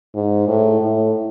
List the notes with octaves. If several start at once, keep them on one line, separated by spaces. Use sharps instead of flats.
G#2
A2
A2